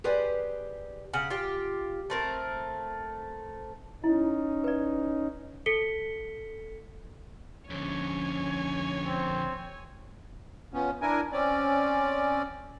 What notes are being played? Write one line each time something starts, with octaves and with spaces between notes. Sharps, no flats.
G4 G#4 B4 C5 D5 G#5
C#3 F#5
F4 G4
A3 C4 A#4
C#4 D#4 E4
B4 D5
A4 B6 C#7 G7
F2 D3 C#4 C#5 G#5
C4
F3 B3 C#4
D4 E4 A#4 G#5
C4 C#4 D5